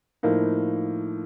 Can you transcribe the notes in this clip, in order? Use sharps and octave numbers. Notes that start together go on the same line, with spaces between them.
A2 F3 A#3 D#4